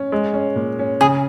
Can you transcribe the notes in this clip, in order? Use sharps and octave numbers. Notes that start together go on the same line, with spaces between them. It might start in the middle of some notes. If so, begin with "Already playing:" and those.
Already playing: C#4
G#3
C#4
A#2
C#4
C#3 G#4